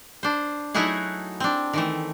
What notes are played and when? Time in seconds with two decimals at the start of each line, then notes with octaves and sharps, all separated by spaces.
0.23 D4 C5
0.74 F#3 A3 D#4 E4 F#4 G#4
1.40 C4 D4
1.73 D#3 E3 A3